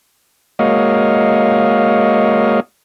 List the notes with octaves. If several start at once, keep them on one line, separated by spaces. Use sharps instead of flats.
G#3 A#3 F#4 C#5 D#5 F5